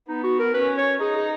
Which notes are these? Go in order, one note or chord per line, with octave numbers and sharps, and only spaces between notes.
B3 D#4
F#4
A#4
C#4 B4
C#5
D#4 G#4
G#4